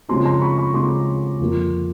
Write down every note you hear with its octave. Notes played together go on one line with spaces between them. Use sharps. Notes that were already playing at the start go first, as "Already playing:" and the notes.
C#3 F3 G#3 C4 D#4 A#5 C6
A#5 C6
B5 C#6
B5 C#6
C#3 F3 G#3 C4 D#4 C6 D6
F2 D3 F3 A#3